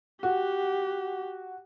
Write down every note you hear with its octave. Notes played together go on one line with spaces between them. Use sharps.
F#4 G4